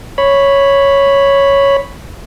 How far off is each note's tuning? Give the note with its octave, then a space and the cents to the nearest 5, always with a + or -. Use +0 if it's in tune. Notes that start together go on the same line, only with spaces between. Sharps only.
C#5 +0 B5 +0